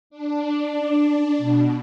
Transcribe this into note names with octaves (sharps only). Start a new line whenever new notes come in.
D4
B2